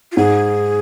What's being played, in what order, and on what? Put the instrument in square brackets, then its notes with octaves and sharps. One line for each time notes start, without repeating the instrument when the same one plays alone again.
[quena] F4
[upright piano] G#2 [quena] G#4